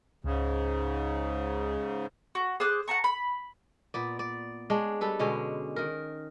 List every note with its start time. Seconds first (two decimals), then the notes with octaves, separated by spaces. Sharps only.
0.24 C#2 G#2 C#3
2.35 F#4
2.60 G#4 C5 D6 F#6
2.88 F#5 A5 A#5 C#6
3.04 B5
3.94 A#2 B3 D5
4.19 D5
4.70 G#3 D4 C#5
5.01 G3 A4 B4
5.19 B2 D3 G#3 C#4
5.76 D#3 A#4